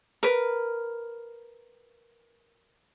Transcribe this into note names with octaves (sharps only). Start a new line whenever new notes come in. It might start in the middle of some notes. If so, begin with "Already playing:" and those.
A#4 B4